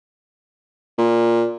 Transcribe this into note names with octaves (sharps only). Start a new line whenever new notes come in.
A#2